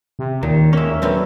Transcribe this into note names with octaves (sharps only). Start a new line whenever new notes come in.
C3
D#2 A#2 D#3
G#3 A#3 C#4 E5
D3 F#3 B3 C4